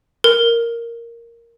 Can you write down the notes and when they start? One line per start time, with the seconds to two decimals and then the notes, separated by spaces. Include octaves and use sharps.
0.24 A#4